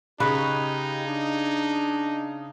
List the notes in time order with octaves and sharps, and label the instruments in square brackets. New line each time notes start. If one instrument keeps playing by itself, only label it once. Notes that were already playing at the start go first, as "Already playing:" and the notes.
[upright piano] C#3 C#6 F#6 [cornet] D#4 [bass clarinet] G4 [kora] B4
[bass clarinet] D4